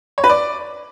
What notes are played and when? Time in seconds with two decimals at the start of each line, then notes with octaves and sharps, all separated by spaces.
0.18 C#5
0.24 B4
0.30 D5